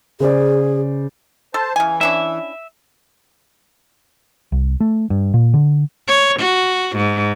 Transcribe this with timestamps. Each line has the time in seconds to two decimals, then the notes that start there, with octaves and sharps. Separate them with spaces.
0.20 C#3 G#4 C5 D5
1.54 A4 C5 A5
1.76 C#3 E3 G#5
2.01 C#4 D4 E4 E5
4.52 C2
4.80 A3
5.10 G2
5.34 A#2
5.54 D3
6.08 C#5
6.39 F#4
6.96 G#2